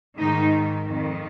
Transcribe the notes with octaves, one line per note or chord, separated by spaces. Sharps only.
G#2 D#3 D#4
F2 D#3